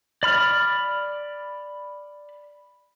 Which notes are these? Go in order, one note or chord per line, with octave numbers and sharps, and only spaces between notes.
D5 B5 F6